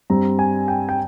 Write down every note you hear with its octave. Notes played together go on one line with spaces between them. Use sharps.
G2 G3 C4 A#5
G#5
G5
G5